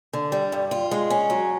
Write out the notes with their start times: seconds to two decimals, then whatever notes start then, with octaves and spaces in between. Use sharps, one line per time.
0.13 D3
0.32 G3
0.52 G2
0.71 F4
0.91 G#3
1.10 C#4
1.30 F#3